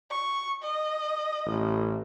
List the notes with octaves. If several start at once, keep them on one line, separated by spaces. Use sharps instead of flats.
C#6
D#5
A1